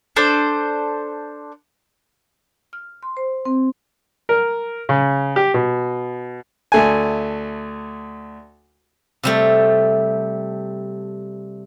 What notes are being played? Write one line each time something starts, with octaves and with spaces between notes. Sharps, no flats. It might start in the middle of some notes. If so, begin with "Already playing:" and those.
D4 A4 C5
F6
C6
C5
C4
A#4
C#3
G4
B2
D2 A3 G#5
C3 G3 A3